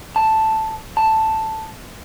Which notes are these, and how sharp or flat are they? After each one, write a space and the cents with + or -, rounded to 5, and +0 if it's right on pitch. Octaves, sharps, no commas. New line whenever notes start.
A5 +0
A5 +5